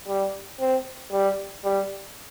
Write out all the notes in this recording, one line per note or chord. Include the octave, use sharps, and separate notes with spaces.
G3
C4
G3
G3